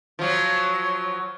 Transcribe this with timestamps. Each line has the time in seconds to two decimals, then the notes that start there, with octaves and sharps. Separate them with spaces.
0.19 F3 F#3